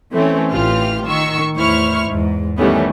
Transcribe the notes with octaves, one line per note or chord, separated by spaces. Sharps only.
E3 A3 C4 C#4
A1 E3 F4 G4 F6
D#3 C#6 E6
E2 A2 E4 C5 C#6 F6
E2 G#2
D#3 E3 G3 A3 B3 C#4